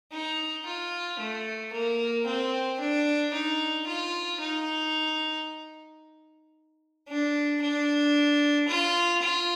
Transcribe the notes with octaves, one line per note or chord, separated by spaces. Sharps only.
D#4
F4
A3
A#3
C4
D4
D#4
F4
D#4
D4
D4
F4
F4